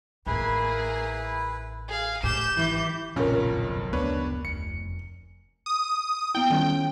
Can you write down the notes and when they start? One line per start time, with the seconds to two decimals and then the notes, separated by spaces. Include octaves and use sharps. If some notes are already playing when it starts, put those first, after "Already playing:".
0.26 A1 D#3 A#3 E4 G#4 B4
1.88 G#4 F5
2.23 A2 G4 G6 E7
2.57 G#1 D#3 E3 G6
3.16 F#1 B1 F2 A#2 F3 C#4 A#4
3.93 F#1 D2 B3 D4 B4 C#5
4.45 F1 C#7
5.66 D#6
6.35 B3 E4 G5
6.50 D#3 G3 C#4